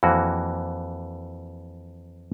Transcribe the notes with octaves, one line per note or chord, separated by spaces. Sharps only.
F2 E3 A#3 F#4